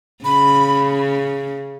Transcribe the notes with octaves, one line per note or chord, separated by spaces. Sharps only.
C#3 B5